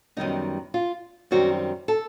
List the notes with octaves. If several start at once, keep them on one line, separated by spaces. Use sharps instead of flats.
F#2 D#3 G3 B3 D#4
F4
F#2 D#3 G3 C4 F#4
A4